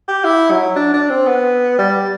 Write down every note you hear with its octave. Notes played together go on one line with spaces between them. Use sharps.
G4
E4
F#3
D4
D4
C4
B3
G3